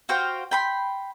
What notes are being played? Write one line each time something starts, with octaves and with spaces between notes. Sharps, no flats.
F#4 C5 F5 G5
G5 B5 C6